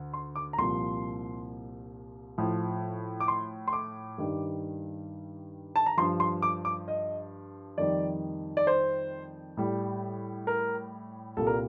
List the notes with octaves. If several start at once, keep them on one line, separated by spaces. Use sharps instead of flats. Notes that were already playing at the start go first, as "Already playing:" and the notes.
Already playing: D2
C6
D6
A#5
C2 A#2 F3 C6
A2 F3
D6
C6
C6
D6
G2 D#3 G3
A5
A#5
G2 F3 C6
C6
D6
D6
D#5
F2 D#3 G3 D5
D5
C5
A2 G3
A#4
C2 A#2 G3 A4
A#4